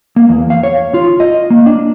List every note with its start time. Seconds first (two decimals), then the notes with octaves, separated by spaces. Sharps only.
0.16 A#3
0.29 E2
0.50 F5
0.63 C#5
0.94 F4
1.20 D#5
1.50 A#3
1.66 D4